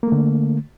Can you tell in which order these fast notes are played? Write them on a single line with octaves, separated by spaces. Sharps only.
A#3 A3 D3